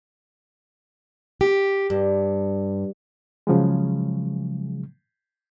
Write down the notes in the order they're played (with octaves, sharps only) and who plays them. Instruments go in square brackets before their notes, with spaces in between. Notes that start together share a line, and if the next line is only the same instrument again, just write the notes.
[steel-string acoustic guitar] G4
G2
[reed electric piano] C#3 F3 F#3 G#3